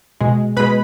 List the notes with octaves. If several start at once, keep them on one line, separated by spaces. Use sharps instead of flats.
B2 G#3
B2 G#3 B4 B5